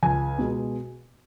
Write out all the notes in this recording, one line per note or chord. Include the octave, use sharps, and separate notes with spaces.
C#2 G#5
B2 G#3